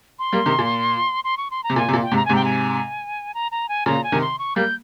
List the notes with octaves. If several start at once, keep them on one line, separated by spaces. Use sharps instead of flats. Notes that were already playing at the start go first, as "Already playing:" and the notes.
C6
G3 A#3
C3 D#3
A#2
C6
C#6
C6
A#5
C3
A#2 G#5
C3
A#2
G5
G#2 C3
A#5
G#2 C3 G#5
G5
G#5
A#5
A#5
G#5
A#2 C#3 A#5
G#5
C3 D#3
C6
C#6
G3 A#3 G6